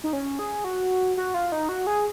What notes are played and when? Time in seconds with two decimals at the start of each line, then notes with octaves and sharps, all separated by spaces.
0.04 D#4
0.13 C#4
0.39 G#4
0.64 F#4
1.17 F#4
1.34 F4
1.52 D#4
1.69 F#4
1.87 G#4